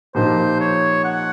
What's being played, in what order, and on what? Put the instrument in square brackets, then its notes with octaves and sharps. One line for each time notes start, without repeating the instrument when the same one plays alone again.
[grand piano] A#2 F3 A#3 D#4 G4 [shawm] C5
[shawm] C#5
F#5